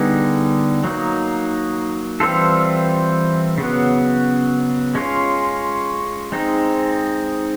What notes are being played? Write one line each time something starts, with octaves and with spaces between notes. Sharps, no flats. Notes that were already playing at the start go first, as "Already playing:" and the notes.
Already playing: D3 G3 B3 D#4 G#4
F#3 A#3 D#4
E3 G3 C4 F4 A4
C#3 F#3 B3
G#3 C#4 F4
G#3 C4 D#4